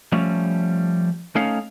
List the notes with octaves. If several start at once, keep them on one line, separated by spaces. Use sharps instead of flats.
F3 G3 A3 C#4
A3 C#4 D#4 C#5 F5